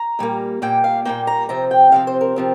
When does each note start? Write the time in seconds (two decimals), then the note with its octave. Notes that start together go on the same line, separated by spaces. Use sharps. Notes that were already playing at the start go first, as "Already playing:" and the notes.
Already playing: A#5
0.19 A#2 G3 A#3
0.62 A#2 G3 A#3 G5
0.84 F5
1.05 A#2 G3 A#3 G5
1.27 A#5
1.49 C3 F3 C4 A#5
1.71 G5
1.92 C3 F3 C4 F5
2.07 C5
2.21 A#4
2.36 C3 F3 C4